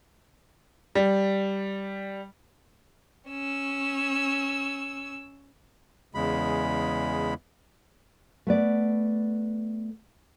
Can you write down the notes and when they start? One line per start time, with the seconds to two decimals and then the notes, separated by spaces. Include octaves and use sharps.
0.95 G3
3.29 C#4 E6
6.15 E2 C#3 G#3 B5
8.47 A3 B3 D5